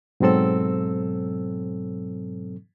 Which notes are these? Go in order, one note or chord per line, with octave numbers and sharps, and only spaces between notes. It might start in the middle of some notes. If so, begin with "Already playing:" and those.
G#2 B2 F#3 C4 A4 E6